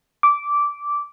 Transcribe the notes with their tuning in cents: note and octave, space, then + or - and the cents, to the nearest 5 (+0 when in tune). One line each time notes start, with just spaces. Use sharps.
D6 -10